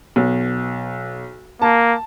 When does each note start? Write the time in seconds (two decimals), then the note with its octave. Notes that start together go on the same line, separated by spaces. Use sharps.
0.16 B1
1.62 A#3 A5